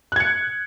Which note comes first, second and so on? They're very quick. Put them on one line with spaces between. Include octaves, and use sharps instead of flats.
F#6 G#6 C#7